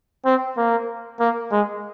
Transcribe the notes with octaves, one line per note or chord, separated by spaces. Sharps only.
C4
A#3
A#3
G#3